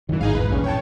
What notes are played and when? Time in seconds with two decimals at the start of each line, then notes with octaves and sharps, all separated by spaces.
0.09 C#2 F#2 D#3 E3
0.21 G#1 G#2 D#4 G#4 F5
0.34 G#1 E2 E3 B4
0.49 A#1 E2 G2 C#4
0.64 C#5 G5 A5